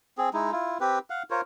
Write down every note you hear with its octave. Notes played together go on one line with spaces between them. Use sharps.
C4 G#4
G#3 D#4 E4
E4 F4
C4 G4 B4
F5 F#5
F4 A#4 C5 C#5